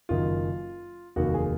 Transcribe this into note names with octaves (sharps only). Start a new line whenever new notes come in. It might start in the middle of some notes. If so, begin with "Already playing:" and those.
F#1 F#2 D#3 F#3 F4
F1 D#2 D#3 F#3 F#4
G#4